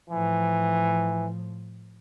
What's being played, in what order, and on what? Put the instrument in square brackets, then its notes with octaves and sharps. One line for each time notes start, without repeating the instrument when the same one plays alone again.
[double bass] A2 F3 [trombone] E3